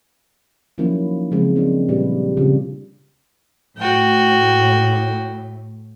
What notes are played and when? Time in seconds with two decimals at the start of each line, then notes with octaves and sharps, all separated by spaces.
0.78 D#3 F3 F#3 A#3 C#4 E4
1.31 C#3 F3 F#3 G#3 C4
1.55 A#3 C4 D4 F4
1.89 A#2 G3 E4 G4 B4 D5
2.37 C#3 G3 C4 D4 F4 G4
3.77 A2 F#4 G5